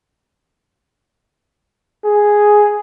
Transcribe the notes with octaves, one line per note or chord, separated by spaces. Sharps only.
G#4